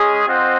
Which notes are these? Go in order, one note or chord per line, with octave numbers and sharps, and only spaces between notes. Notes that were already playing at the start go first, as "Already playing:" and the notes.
Already playing: G#3 C#4 G#4
C4 F4 C5 D#5 F#5